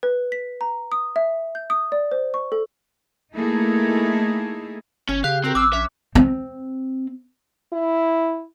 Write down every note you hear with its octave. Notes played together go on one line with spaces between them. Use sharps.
B4
B6
A#5
D#6
E5
G6
D#6
D5
C5
C#6
A4
A3 A#3 D#4 E4 G#4 A4
G1 C#4 G#5
C#3 G4 F5 F#6
C4 F#4 G4 A#4
A1 B5 D6 E6 F6
A#1 C#4 E5
C4
E4